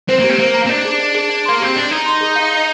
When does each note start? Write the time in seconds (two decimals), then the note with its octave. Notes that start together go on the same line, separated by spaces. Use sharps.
0.09 C4 C5
0.19 A#3 G4
0.29 C4
0.39 A#3 C5
0.54 A#5
0.65 C4
0.69 D4 D#5
0.85 G#4
1.00 D#5
1.14 G#4
1.30 D5
1.45 A#3 C6
1.60 C4 G4
1.76 D4 D#5
1.91 D#4 D5
2.06 C6
2.21 G#4
2.36 F5
2.51 D5